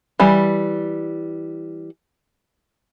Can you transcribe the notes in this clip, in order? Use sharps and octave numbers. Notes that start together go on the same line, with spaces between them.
E3 G3